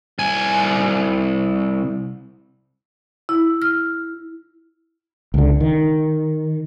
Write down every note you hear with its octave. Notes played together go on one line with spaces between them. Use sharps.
C2 G#5
E4
F6
C#2 D3
D#3